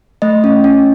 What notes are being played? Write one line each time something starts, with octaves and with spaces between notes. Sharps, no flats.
A3 D#5
C#4
C#4